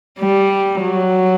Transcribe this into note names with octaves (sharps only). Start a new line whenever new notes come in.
G3
F#3